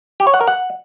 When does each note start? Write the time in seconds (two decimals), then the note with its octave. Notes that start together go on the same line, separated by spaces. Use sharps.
0.20 G4
0.27 C#5
0.34 F#5
0.41 A#4
0.47 F#5